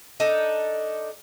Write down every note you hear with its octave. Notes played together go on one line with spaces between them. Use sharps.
D4 D#4 A4